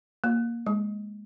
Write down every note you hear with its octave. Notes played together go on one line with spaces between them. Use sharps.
A#3
G#3